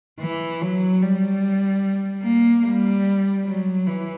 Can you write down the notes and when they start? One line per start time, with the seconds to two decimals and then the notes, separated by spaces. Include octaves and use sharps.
0.20 E3
0.61 F#3
1.02 G3
2.24 A#3
2.65 G3
3.46 F#3
3.87 E3